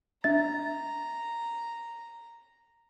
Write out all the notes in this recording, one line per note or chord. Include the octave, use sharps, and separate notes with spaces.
D4 E5 A#5 A6